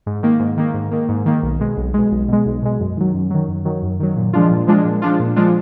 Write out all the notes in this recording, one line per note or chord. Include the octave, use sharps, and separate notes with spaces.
G#2
D#3 A#3
G#2
D#3 A#3
G#2
D#3 A#3
G#2
D#3 A#3
B1
B2 G#3
B1
B2 G#3
B1
B2 G#3
B1
B2 G#3
F#2
D#3 F#3
F#2
D#3 F#3
F#2
D#3 F#3
F#2
D#3 F#3
A#2
F3 G#3 D4 F4
A#2
F3 G#3 D4 F4
A#2
F3 G#3 D4 F4
A#2
F3 G#3 D4 F4